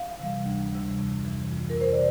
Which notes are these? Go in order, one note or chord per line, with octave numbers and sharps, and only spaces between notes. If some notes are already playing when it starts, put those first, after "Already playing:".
Already playing: F5
C3 E3 G3
D2
C3 E3 G3
F2
C3 E3
F2
A#4
C3 E3 C5
D5